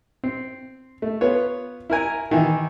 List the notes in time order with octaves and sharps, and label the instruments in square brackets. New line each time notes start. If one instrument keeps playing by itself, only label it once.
[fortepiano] C4
A3
B3 F4 B4 C#5
E4 A#4 G#5 A#5
D#3 E3